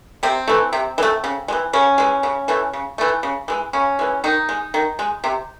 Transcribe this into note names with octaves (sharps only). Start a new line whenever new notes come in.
C3 C4
E3 A3
C3
E3
A3
C#3
G#3
E3
C#3 C#4
E3 G#3
C#3
E3 A3
C#3
E3 A3
C#3
E3 G#3
C#3 C#4
E3 G#3
D#3 D#4
G#3
D#3
G#3
C3